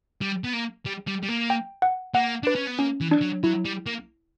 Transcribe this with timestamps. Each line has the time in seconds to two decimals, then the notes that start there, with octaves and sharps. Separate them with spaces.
0.21 G3
0.44 B3
0.53 A#3
0.86 G3
1.08 G3
1.23 G3
1.29 A#3
1.50 G5
1.82 F#5
2.14 A#3 F#5
2.43 D4 B4
2.55 C#4
2.67 B3
2.79 A#3 C#4
3.01 E3
3.11 D4
3.22 F#3
3.44 F#3 E4
3.65 G3
3.86 A#3